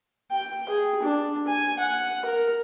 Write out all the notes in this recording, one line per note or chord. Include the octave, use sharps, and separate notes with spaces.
G5
G#4
D4
G#5
F#5
A#4